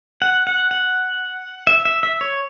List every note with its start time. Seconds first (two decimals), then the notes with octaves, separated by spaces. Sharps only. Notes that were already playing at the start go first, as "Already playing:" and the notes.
0.22 F#5
0.47 F#5
0.71 F#5
1.67 E5
1.85 E5
2.03 E5
2.21 C#5